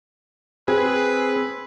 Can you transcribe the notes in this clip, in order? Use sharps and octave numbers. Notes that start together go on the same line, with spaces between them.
C4 G#4 B4